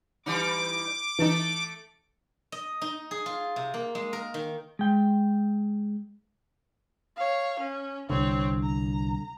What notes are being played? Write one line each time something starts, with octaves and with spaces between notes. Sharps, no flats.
E3 G3 D#4 D6
E3 A3 D#4 A4
D#5
D#4
G#4
F4
C3
A#3
G#3
A#4
D#3
G#3 G5
C#5 F5
C#4
C2 D3 C4 C#5
A#5